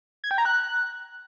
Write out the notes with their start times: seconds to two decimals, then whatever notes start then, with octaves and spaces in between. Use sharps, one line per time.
0.24 G#6
0.31 G5
0.38 A#5
0.45 F#6